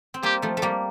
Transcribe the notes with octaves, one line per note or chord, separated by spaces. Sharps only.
C4
G3 A#3 G4
F3 A3
A3
G3 A#3